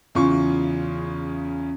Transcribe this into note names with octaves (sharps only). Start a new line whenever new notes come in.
E2 C#3 F4 C6 C#6